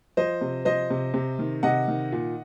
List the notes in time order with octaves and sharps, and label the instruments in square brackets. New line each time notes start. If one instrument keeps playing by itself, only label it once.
[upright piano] F3 C5 D#5
C3
F3 C5 D#5
C3
C3
D#3
C3 D#5 F#5
D#3
A#2